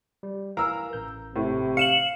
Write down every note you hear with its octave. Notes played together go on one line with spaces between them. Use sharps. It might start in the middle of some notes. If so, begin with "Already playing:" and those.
G3
E3 A#4 F5 A#5 E6
A1 G6
A2 C3
F5 C#7 E7 F#7